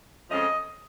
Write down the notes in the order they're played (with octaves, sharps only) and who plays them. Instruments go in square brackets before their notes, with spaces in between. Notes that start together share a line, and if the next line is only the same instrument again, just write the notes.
[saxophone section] F2 F3 G#3 C#4 D#5